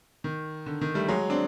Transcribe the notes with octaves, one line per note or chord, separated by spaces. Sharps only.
D#3
D3
D#3
G3 A3
F#3 G#3
C4 D4